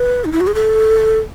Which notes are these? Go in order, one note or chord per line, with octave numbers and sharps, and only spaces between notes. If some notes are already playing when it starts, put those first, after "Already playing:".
Already playing: B4
D#4
E4
F#4
G#4
A4